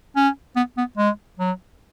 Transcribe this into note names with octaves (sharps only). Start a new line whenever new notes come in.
C#4
B3
B3
G#3
F#3